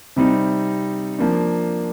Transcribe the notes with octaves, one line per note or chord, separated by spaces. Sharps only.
C3 G3 C4 D#4
F3 A#3 D4